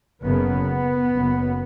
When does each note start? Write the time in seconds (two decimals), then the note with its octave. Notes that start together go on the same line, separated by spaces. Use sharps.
0.23 F#1 F#2 C#3 B3
1.13 F#1 F#2 C#3